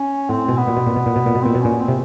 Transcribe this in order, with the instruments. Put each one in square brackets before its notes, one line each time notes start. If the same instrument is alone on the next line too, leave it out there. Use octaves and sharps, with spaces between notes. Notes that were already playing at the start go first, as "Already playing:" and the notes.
Already playing: [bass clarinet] C#4
[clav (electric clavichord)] A2 [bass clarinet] C4
[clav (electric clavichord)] B2
[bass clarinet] B3
[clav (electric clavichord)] A#2
B2
A#2
B2
A#2
B2
A#2
B2
[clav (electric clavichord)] A#2 [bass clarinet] C4
[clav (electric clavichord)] B2
[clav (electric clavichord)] A#2 [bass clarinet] C#4
[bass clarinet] C4
[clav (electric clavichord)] C3